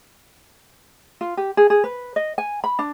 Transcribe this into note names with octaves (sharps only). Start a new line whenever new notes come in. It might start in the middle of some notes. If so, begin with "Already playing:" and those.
F4
G4
G#4
G#4
B4
D#5
G#5
B5
D4